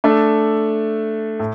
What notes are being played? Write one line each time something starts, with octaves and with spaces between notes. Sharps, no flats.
A3 D4 A4
A2